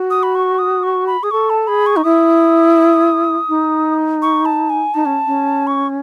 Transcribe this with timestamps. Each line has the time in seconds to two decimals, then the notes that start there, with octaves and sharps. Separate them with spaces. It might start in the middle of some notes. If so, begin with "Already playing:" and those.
Already playing: F#4
0.10 D#6
0.23 B5
0.35 C#6
0.59 D#6
0.83 C#6
1.07 B5
1.23 G#4 D#6
1.31 A4 C#6
1.50 A5
1.67 G#4 B5
1.86 C#6
1.96 D#4
2.04 E4 D#6
3.49 D#4
4.22 C#6
4.45 A5
4.70 G#5
4.94 D#4 A5
5.05 C#4
5.27 C#4
5.67 C#6